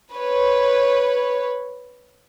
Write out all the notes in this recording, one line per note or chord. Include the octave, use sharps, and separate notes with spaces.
B4 C#5